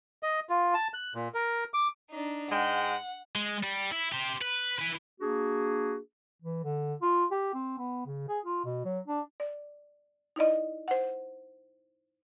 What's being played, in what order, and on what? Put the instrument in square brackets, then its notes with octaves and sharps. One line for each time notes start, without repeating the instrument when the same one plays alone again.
[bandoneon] D#5
F4
A5
F#6
A#2
A#4
D6
[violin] D4 D#4
[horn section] G#2 G#3 G5 [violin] F#5
[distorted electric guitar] G#3
G3
E4
G4 C5
B4
E4 B4
[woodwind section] A#3 D4 F#4 G#4
[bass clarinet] E3
D3
F4
G4
C4
B3
C#3
G#4
F4
B2
F#3
D4
[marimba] D5
D#4 E4 D5 D#5
C5 F#5